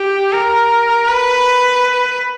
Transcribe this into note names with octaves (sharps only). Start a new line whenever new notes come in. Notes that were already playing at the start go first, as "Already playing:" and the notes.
Already playing: G4
A#4
B4